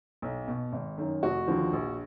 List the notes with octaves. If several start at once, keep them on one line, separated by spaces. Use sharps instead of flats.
B1
B2
G#1
F#2 D#3
F1 F#4
D#2 D3 F3
A#1